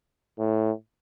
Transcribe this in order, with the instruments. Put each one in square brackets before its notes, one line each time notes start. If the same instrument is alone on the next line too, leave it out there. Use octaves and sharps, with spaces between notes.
[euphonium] A2